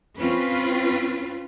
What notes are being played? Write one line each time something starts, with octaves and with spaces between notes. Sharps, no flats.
C4 C#4 F4 B4